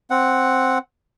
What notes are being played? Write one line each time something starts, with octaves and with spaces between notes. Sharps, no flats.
C4 F#5